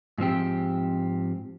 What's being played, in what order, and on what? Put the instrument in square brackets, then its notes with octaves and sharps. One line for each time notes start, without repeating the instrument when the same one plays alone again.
[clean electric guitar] G#2 F3 C4 G4